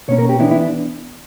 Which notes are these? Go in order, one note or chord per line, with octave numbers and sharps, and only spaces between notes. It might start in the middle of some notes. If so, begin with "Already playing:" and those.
B2 A#3 C#4 C#5
A#4
G4
E3 B3 D4 E4
E4
D4